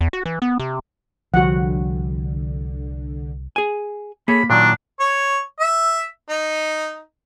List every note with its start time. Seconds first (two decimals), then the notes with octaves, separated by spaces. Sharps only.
0.01 E2
0.13 F#4
0.26 E3
0.42 B3
0.59 C3
1.34 C2 D3 F3 G3 F#4 F#5
3.56 G#4 G#5
4.28 A#3 G#4 A4 C#5 B5
4.50 A#2 D#3 F#3 D4
5.00 C#5
5.60 E5
6.29 D#4